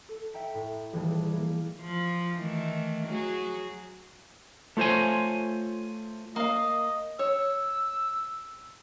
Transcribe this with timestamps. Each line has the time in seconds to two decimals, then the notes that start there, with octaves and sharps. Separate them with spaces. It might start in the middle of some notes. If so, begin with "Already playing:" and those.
0.09 A4
0.33 E5 G5 A#5 B6 C#7
0.54 A2
0.93 D#1 E3 G3 G#4 A5
1.32 E3 A#3
1.81 F3
2.38 D#3 E3 A3
3.07 F#3 F#4 G#4
4.77 A3 F4 C5 C#5 G#5
6.36 A#3 D#5 F5
7.19 C#5 E6